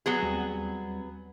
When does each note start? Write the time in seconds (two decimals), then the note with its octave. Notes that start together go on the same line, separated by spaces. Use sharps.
0.06 F#3 B3 G#4
0.22 D#2 G3 C4